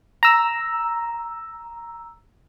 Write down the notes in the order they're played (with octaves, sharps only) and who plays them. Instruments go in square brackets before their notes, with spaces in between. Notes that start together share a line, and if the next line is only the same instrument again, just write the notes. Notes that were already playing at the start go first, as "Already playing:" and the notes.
[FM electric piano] A#5 E6